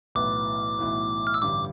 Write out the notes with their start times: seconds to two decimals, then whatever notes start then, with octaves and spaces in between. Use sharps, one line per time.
0.15 B1 A2 E3 B3 D6
0.79 B1 A2 E3 B3
1.27 F6
1.34 E6
1.42 A1 G2 D3 G3 D6